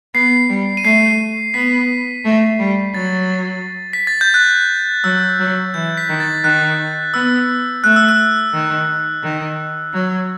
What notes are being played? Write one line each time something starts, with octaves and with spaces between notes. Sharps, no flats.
B3 C7
G3
D#7
A3 C7
B3 B6
A3
G3
F#3 A6
B6
A6
G6
F#6
F#3 E6
F#3
E3 G6
B6
D#3
A6
D#3 F#6
B3 E6
A3 F#6
E6
F#6
D#3
D#3
F#3